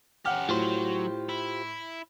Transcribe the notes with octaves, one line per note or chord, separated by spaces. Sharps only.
C#4 G4 F#5 F6
A2 F#3 F4 G4 C5
E4